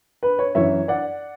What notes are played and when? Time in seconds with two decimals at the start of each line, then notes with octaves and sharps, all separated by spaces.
0.23 B4
0.39 C#5
0.55 F#2 E3 C#5 E5
0.88 D5 F#5